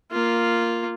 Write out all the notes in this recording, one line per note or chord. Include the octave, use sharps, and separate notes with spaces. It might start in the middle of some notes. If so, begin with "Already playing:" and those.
A#3 F4